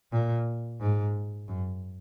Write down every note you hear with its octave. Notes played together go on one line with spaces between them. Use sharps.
A#2
G#2
F#2